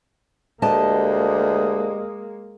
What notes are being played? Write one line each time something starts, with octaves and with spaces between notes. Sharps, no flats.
D2 G#3 A#3 G4 D#5 A5